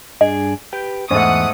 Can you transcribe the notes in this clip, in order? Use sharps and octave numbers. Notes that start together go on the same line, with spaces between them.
G2 D4 G#4 D#5
G4 B4 G5
E2 G#2 A3 F#5 D#6